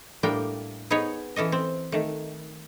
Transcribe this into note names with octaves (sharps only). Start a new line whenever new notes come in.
A2 G3 A#3 D4 A#4 G5
B3 D#4 G#4 B4 C#5
E3 C#4 A4 D#5
C4
D#3 A3